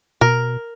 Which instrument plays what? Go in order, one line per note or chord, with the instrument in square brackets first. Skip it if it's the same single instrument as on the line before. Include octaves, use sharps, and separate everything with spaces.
[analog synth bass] B2 [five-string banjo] A#4